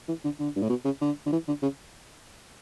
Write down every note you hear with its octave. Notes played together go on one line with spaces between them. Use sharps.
E3
D3
D3
G2
A2
B2
C#3
D3
D3
E3
D3
C#3